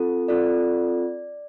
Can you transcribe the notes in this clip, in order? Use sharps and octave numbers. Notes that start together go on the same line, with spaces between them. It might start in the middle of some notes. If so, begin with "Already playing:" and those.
Already playing: C4 F4 A4
C4 F4 A4 D5